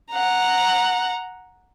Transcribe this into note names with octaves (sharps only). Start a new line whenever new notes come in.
F#5 A#5